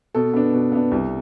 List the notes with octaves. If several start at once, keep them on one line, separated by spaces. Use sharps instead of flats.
B2 A4
B3 D4
B2
B3 D4
C2